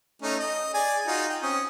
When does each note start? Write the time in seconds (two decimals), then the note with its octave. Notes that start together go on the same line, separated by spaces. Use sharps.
0.22 A3 C#4 D#4
0.40 D#5
0.74 G#4 D5 G#5
1.07 D#4 F4 F#4
1.29 G5
1.42 C4 C#4 D#6